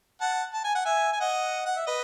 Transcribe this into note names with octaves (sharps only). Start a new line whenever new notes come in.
F#5 A5
A5
G#5
F#5
E5 G#5
G#5
D#5 F#5
F#5
E5
B4 D#5